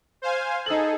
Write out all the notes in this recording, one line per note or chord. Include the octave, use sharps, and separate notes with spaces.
C5 F5 G#5
D#4 G#4 A4 F#7